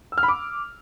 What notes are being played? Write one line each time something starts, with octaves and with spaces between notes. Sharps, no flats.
E6
F6
B5
D6